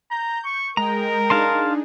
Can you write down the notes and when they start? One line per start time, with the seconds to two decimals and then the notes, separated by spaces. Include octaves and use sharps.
0.11 A#5 G6
0.45 C#6
0.77 G#3 A#4 D#5 G5 A#5
1.30 D4 D#4 G#4 F5 A5 C6